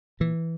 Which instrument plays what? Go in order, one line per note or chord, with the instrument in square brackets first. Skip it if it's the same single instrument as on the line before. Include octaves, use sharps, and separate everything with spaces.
[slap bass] A#2 E3